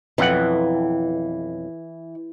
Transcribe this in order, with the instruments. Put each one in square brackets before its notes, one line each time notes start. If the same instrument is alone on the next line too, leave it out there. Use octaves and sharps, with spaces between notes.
[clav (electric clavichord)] B1 F2 F#5 [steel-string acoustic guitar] E3